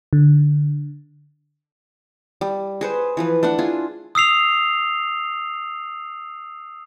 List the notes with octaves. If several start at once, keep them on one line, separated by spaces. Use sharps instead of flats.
D3
G3
G#4 B4 C5
E3 F3 B4
A3 D4 F#5
E4 F4 G#4
D#6 E6 C7 F7